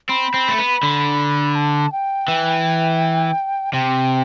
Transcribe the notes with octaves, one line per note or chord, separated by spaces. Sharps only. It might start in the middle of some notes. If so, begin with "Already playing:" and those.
C4 B5
C4
A3
B3
D3
A5
G5
E3
C3 G5